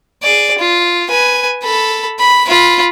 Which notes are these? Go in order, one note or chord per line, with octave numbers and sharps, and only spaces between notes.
G#4 D5
F4
B4 G#5
A4 B5
B5
F4 B5